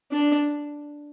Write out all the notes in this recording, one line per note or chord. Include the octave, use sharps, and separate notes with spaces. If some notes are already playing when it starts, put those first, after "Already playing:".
D4